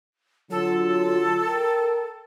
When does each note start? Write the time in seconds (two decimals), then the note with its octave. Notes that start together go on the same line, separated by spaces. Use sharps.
0.51 D3 F#3 F4 A4
1.47 A#4 G5